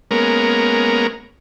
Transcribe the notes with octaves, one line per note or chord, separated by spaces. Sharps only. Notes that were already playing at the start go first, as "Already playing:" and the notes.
G#3 A#3 B3 C#4 A#4